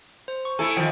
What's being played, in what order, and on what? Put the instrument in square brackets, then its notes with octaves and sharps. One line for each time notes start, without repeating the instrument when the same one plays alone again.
[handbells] C5
C#6
[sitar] A3 E4 A4 [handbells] G#5
[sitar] D#3 F3 [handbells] G5